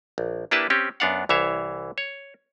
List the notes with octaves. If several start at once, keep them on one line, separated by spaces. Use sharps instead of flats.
A#1
A#3 D4 E4 G4 B4 A5
C4 C#4 G4
F#2 B3 D4 F5 F#5
C2 E3 C#5 E5 F5
C#5